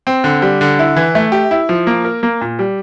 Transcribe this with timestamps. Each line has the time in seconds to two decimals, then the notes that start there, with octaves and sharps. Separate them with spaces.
0.07 C4
0.24 D3
0.42 G3
0.61 D3
0.79 E4
0.96 E3
1.15 A3
1.32 G4
1.51 E4
1.69 F3
1.87 A#3
2.05 A#4
2.23 A#3
2.41 A#2
2.59 G3